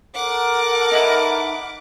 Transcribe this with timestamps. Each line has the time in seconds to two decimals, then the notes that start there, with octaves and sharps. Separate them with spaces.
0.15 A4 A#4 F#5 D6
0.91 D#4 E4 B4